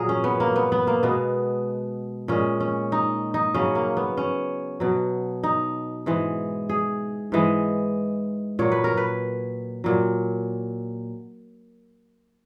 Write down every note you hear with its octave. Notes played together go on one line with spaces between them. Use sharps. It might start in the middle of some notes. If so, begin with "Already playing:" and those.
Already playing: A#2 F#3 G#4 A#4
C#4
B3
A#3
B3
B3
A#3
B2 G#3 B3
A#2 G#3 C#4
C#4
D#4
D#4
C#3 F#3 C#4
A#3
B3
C#4
B2 F#3
D#4
G#2 E3 G#3
G#4
G#2 E3 G#3
A#2 F#3 C#5
B4
A#4
B4
A#2 F#3